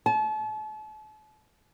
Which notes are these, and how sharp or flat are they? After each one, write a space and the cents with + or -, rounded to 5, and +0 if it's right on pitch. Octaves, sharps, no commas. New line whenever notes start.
A5 -40